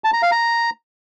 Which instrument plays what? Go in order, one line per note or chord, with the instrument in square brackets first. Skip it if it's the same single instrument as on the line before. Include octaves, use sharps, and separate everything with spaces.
[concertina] A5
A#5
F5
A#5